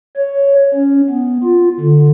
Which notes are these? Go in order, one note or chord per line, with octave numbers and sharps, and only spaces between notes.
C#5
C#4
B3
F4
D3